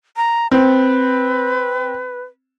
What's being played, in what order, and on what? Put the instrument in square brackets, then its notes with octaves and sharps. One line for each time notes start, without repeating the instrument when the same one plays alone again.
[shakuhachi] A#5
[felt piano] C4 [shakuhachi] B4